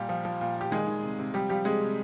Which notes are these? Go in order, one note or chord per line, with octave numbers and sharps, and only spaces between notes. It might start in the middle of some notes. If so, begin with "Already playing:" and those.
Already playing: A#2 G3 G4
F3
F3
A#2
A#2 G4
D#3 G#3 G#4
D#3
C3
C3
F3 G3 G4
F3 G3 G4
C3 G#3 G#4
C3